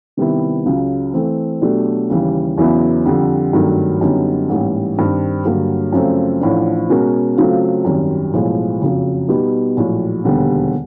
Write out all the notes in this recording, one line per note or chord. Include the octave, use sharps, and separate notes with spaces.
C3 D#3 G3 B3 E4
C#2 C#3 F#3
E3 A3 C4
B2 F#3 A3 D4 G4
D#2 C#3 E3 G3
E2 C#3 F#3 B3 E4
F2 D3 G3
G#1 G2 D#3 F#3 A3
F#2 D3 G3 B3 D#4
A1 G#2 E3 G3 A#3
G2 D#3 G3 C4
G2 D3 F#3 A#3
F#2 C#3 F3 A3 C4
A1 A2 F3 A3 D4
B2 G#3 C#4 F#4 A#4
C#3 F#3 A3 C4 F4
G#1 F#2 D#3 G3
B1 A2 F3 G#3
F#1 F2 C#3 F#3
B2 G3 B3 D#4 G4
A#1 A2 F#3
E1 D#2 D3 G3 B3